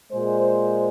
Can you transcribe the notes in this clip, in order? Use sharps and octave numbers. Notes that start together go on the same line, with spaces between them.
A#2 G#3 C5